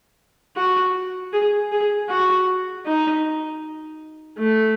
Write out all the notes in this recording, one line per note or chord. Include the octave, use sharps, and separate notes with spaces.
F#4
G#4
G#4
F#4
D#4
A3